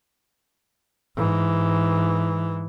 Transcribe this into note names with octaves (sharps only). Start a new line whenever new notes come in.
G#2 E3